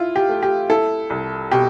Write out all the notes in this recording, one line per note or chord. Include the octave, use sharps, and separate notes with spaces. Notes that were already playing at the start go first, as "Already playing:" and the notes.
Already playing: E4 F4
G4
A3
G4
E4 A4
C2
B2 G4